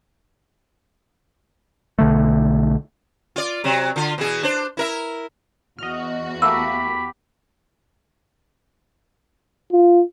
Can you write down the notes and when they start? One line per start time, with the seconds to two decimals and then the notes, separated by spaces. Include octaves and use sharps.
1.99 B1 D3 A3
3.36 F4 D5
3.64 C3 F#3
3.96 D3 F4
4.18 B2 E3 G#4
4.43 D4 C5
4.77 E4 A#4 E5
5.79 E2 F#4 D#5 F6
6.42 A3 A#3 G4 B5 E6
9.72 F4